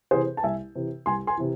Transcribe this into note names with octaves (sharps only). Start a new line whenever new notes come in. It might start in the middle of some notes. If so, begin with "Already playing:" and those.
C3 E3 G#4 C5
A5
C2 E5 G#5
C3 E3
C2 G#5 C6
G#5 C6
C3 E3